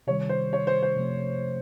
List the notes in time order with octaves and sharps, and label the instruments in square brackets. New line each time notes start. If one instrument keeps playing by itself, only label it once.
[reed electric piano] C3 D#3 G3 [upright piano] C#5
[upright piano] C5
C#5
C5
C5
[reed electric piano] C3 F3 A3